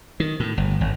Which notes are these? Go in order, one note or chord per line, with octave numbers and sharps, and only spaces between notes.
D#3
A2
G1
G1